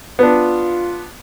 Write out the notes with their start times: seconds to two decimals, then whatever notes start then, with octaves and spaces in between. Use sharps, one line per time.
0.19 B3 D4 F4